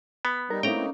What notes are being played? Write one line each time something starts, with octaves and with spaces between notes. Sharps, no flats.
B3 B5
G3 D#4 A#4
A3 A#3 C4 C#4 D#4 E4 G5 A#5